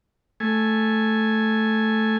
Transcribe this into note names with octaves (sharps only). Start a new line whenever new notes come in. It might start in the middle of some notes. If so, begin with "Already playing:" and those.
A3 G#5